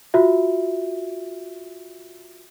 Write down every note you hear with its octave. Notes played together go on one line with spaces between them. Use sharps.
F4 F#4 E5